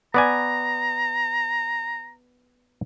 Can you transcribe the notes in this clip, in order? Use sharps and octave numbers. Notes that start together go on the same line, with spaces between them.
B3 D5 G#5 A#5